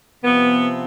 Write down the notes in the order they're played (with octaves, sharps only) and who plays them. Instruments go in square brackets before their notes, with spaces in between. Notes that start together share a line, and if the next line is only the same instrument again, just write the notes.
[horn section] C3 F3 B3